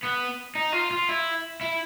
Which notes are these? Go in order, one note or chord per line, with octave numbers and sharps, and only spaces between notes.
B3
D#4
F4
F4
E4
E4